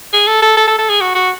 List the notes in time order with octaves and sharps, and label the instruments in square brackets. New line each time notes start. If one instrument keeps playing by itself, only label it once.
[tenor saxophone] G#4
A4
A4
A4
A4
A4
G#4
F#4
F#4